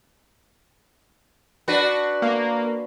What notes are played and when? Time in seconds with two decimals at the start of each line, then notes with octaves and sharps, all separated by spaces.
1.68 D4 F#4 B4
2.22 A#3